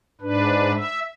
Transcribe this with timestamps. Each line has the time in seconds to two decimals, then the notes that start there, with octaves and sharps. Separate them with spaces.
0.21 G#2 D4 B4
0.74 E5